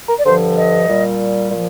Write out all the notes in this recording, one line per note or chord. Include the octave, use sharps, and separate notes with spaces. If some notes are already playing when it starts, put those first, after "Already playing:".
A#4
D5
G2 D3 F3 C5
D#5
A#2 G3
A#2 F3